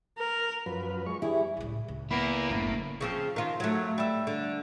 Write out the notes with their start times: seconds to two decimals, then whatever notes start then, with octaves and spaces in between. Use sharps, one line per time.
0.18 A#4
0.66 F#2 F3 B4
1.06 G#3 C#6
1.22 G3 E4 G#4
1.57 C#2 A2
1.88 C#2
2.11 A#3 B3 E4
2.50 F#1 A2 D4
3.01 C#3 F3 C4
3.36 D#3 F4
3.60 F#3 A3
3.98 G3 E5
4.27 D3